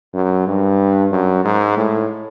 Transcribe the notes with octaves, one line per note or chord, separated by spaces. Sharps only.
F#2
G2
F#2
G#2
A2